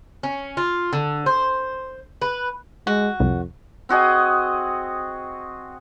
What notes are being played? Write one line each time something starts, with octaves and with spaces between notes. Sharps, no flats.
C#4
F4
D3
C5
B4
G#3 F#4
C2 F2
C4 F#4 G#4 D#5